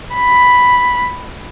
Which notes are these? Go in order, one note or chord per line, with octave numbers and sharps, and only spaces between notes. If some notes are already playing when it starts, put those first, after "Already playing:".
B5